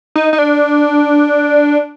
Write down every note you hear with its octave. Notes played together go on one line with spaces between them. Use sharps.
D#4
D#4
D4